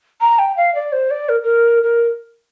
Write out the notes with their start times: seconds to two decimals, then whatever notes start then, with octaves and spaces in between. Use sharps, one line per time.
0.21 A#5
0.38 G5
0.56 F5
0.74 D5
0.92 C5
1.10 D5
1.29 A#4
1.43 A#4
1.82 A#4